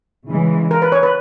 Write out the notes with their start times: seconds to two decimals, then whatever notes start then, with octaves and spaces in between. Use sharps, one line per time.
0.30 C#3 E3 G#3
0.71 A#4
0.82 B4
0.92 C#5
1.03 B4